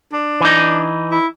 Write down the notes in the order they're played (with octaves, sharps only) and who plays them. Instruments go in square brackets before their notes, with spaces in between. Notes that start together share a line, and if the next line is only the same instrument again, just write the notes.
[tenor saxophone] D4
[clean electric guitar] E3 D#4
[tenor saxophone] E4